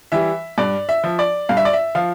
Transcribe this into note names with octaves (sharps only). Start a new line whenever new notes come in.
E3 G3 E5
G2 D5
E5
F3
D5
G2 F5
E5
D5
E5
F3 F5